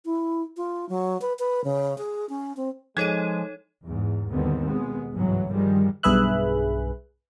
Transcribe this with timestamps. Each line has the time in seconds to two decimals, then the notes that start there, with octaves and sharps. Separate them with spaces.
0.05 E4
0.57 F4
0.89 F#3
1.21 B4
1.39 B4
1.64 C#3
1.98 G#4
2.29 C#4
2.57 C4
2.97 F3 G#3 D#4 A4 C#5 G#6 D#7
3.83 E2 G#2
4.29 D#2 G#2 D3 G3 B3 C4
4.64 B2 D#3 G#3 B3
5.14 G1 C2 G#2 E3 F#3
5.52 G2 D#3 F3 G3 G#3
6.03 B1 G2 G#4 B4 E5 F#6